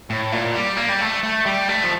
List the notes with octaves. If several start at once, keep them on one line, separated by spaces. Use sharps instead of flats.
A2
A#2
G3
A#3
G3
A3
A3
G3
A3
F3